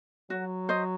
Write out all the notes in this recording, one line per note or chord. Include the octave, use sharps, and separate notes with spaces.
F#3 F#4
C5 D#5